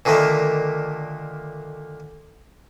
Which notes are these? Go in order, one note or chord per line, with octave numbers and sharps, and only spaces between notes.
A#2 D3 D#3 A3 A#3